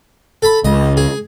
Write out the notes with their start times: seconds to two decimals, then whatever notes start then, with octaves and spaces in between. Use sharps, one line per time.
0.42 A4 B5
0.65 C#2 D#5
0.97 G#4